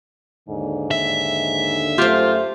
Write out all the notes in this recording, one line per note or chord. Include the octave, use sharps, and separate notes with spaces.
D#2 G#2 D3
E5
F#2 A3 F4 G4 C5